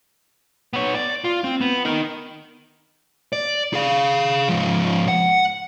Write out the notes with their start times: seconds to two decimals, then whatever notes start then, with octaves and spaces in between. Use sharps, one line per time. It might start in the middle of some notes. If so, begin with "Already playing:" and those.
0.73 B3 C#5
0.95 D5
1.24 F4
1.44 C4
1.61 B3
1.85 D#4 A#4
3.33 D5
3.74 G#4 F5
4.49 G#2 F3
5.08 F#5